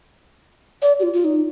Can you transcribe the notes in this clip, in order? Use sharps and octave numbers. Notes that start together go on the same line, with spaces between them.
D5
G4
F4
F4
D#4